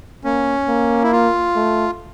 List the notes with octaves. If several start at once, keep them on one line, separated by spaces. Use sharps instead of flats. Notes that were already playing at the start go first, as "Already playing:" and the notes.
A#3 C#4
A#3
E4
F4
A3